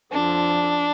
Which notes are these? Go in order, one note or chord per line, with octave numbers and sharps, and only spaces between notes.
F2 D3 F3 D4